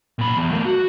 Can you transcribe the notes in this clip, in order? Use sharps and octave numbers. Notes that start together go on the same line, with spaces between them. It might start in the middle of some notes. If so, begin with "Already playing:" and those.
A#2 B5
E2
A3 A#4
F#4